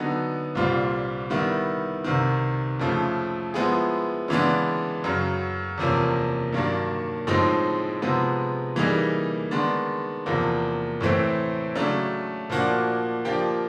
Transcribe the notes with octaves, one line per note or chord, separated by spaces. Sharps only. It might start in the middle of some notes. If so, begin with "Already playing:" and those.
Already playing: D3 F#3 B3 D#4
C2 A#2 G3 C4 F4
D#3 G3 B3 E4
C2 C3 D#3
F2 C#3 F3 A3
F3 G#3 B3 E4 G#4
C#3 E3 G#3 B3 D4
F#2 C#3 F#3
E2 C3 F3 A#3 C#4
G2 D#3 F#3 A#3 D4
A2 F3 G#3 C4 D#4
C3 F3 G#3 B3
E3 G3 A#3 D#4 G#4
D#3 G#3 B3 D4
E2 C3 F3 A#3
A2 E3 A3 C4
C#3 F#3 A3 D4
A#2 F3 A#3 D4 F#4
F3 A#3 D4 G4